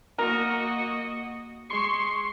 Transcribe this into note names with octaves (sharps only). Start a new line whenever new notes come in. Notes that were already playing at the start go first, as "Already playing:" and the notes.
A#3 F#4 A#4 D#5
G#3 C6 C#6 C7